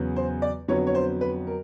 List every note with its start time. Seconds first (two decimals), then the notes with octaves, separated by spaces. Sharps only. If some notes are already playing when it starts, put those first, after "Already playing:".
Already playing: E2 C#3 F#3 B3
0.16 C5
0.42 D5
0.68 F2 D3 F#3 B3 C#5
0.87 C#5
0.95 C5
1.21 B4
1.47 A#4